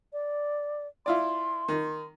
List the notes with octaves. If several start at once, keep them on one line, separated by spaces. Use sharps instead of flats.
D5
E4 F4 D5 C6
D#3